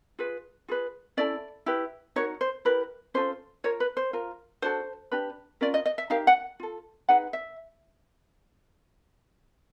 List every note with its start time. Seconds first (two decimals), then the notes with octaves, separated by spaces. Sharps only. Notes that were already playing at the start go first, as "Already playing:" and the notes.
0.19 F4 G#4 B4
0.68 F4 G#4 B4
1.17 C#4 E4 A4 D5
1.66 E4 G4 B4
2.16 D#4 F#4 A#4 C#5
2.41 C5
2.65 E4 G4 A#4 B4
3.14 C#4 F4 A4 C5
3.64 F4 A#4 C#5
3.80 B4
3.97 C5
4.13 F4 A#4
4.62 D4 F#4 A4 C5
5.12 D4 G4 B4
5.61 C#4 F4 A#4 D5
5.74 D#5
5.86 D#5
5.98 E5
6.10 D#4 G4 A#4 F5
6.27 F#5
6.60 F4 A4
7.09 D#4 G#4 B4 F#5
7.33 E5